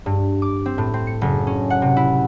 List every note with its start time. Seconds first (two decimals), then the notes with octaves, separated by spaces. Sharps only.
0.06 G2
0.42 D6
0.66 C4
0.78 A2
0.94 C4
1.07 C#7
1.21 F#1
1.47 C#4
1.70 F#5
1.82 C3
1.97 E4